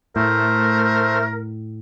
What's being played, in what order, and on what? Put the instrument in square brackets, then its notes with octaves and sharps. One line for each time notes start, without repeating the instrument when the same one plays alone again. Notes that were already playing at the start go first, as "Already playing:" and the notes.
[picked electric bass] A2 [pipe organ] A3 C5 [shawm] A#4